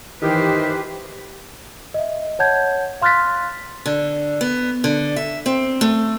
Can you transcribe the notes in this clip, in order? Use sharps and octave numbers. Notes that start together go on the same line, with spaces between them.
D#3 E3 G4 B4 C5
D#5 E5
C#5 F#5 A5 G6 G#6
F5 C6 F6 F#6 A6 B6
D3
B3
D3
E5
C4
A3